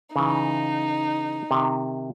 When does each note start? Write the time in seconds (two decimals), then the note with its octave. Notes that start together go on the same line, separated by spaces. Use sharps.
0.16 C#3 E3 D#4
1.51 C3 D#3